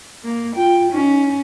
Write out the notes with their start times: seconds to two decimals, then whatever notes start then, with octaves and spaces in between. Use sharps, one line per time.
0.24 A#3
0.56 F4 G5
0.92 C#4 D#4